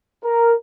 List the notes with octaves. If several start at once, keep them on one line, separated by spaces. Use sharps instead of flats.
A#4